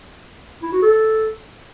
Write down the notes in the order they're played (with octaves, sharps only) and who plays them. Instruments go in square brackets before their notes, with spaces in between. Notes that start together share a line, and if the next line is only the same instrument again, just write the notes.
[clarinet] E4
F#4
A4